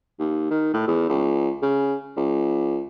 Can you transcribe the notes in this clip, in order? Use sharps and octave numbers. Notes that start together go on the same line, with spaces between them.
D#2
D#3
A2
E2
C#2
C#3
C#2